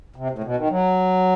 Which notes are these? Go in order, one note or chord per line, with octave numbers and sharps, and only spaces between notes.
C3
A2
C3
B2
D#3
F#3